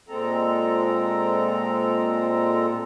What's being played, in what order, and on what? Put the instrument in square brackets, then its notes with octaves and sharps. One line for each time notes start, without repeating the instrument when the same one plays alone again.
[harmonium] A#2 G#3 C4 A4 A#5